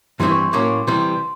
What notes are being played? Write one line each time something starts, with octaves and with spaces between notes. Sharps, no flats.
G2 E3 G3 C4 E4 C6
C#6
C#6
A2 F#3 A#3 C#4 D6
C2 C3 E3 G3 C6